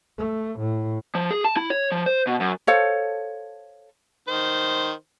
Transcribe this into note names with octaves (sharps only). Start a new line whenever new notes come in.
A3
A2
F3
G#4
A5
E4
C#5
F3
C5
B2
F#2
A4 C5 C#5 F5
D#3 C5